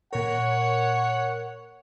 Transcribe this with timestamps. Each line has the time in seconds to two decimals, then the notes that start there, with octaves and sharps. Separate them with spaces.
0.13 A#2 A#4 C#5 F#5